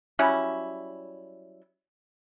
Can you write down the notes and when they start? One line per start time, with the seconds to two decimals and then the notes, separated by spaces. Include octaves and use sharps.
0.19 F#3 G3 C#4 E4